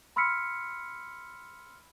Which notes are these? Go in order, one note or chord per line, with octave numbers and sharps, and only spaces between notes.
B5 C6 E6 F6 B6 C#7